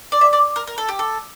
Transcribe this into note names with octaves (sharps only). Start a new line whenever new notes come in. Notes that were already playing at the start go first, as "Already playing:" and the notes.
D5
E5
D5
A#4
A#4
A4
G4
A4